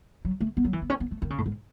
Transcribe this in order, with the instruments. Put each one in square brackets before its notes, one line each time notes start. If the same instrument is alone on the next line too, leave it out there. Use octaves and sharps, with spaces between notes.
[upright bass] F#3
A3
B3
F#3
E3
B3
C#4
B3
A3
D#3
C#3
A2
G#2